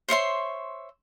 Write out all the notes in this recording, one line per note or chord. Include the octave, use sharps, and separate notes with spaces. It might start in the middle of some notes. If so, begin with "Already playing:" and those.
C5 C#5 E5 C6